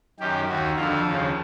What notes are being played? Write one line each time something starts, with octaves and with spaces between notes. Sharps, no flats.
F#2 D#3 G4
D#2 D#3 F#4
F2 D3 F3 F4
D#2 C#3 F3